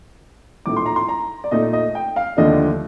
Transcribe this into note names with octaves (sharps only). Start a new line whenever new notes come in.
A#1 A2 A3 D#4 D6
C6
A#5
C6
A#5
D5
A#2 A3 D#4 D#5
D#5
G5
F5
D#2 D3 F3 A3 D4 D#5